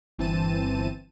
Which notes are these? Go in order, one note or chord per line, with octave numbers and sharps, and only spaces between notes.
G1 E3 C4 A5 D#7